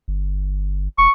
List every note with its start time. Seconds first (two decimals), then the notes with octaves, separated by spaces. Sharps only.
0.08 G1
0.98 E1 C#6